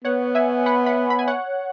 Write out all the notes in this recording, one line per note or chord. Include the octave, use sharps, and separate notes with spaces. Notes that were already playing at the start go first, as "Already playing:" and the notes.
B3 C#5 F#5
E5 G#5
F#5 B5
F#5 B5
B5
G#5
C#5 F#5